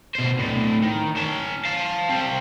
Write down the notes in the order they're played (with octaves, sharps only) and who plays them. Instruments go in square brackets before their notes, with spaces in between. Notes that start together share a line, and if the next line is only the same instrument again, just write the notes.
[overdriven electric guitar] B2 C5
D2 A2
D#3
C#4 A5
F5 A5
G3 C4